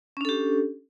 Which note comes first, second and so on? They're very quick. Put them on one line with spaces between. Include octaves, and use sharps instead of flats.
C#4 D4 A4 G4